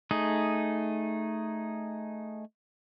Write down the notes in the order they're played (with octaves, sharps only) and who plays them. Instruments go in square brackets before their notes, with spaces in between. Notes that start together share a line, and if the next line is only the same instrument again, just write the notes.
[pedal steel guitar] A3 D#4 G#4